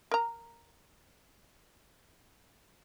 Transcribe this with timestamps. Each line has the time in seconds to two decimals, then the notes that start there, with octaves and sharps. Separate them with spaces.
0.11 A#4 A#5